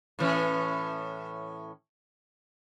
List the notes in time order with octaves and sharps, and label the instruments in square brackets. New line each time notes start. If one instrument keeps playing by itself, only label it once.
[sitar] A2 E3 C#4